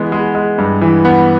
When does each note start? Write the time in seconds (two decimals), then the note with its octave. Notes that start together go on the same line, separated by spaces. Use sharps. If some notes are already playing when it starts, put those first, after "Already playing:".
Already playing: E3 G#3 B3
0.12 G#3
0.35 G#3
0.58 G2
0.82 E3
1.05 B3